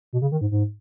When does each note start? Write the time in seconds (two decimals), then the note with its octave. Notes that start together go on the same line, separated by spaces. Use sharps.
0.13 B2
0.22 C#3
0.32 D#3
0.41 G#2
0.51 G#2